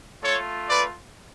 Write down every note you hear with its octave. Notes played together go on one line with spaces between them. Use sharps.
A3 F4 A4 C#5
B4 D5